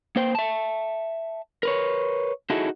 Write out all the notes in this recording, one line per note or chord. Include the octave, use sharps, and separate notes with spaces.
A#3 C5 G5
E5 A5
A#4 B4 C#5
D#4 E4 F#4 G#4 A4